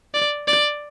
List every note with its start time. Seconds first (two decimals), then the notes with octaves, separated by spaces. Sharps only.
0.14 D5
0.47 D5